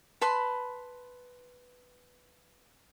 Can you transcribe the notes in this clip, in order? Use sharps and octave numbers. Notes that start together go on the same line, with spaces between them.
B4 A5 B5 C6